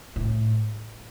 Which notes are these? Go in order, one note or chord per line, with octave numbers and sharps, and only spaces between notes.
A2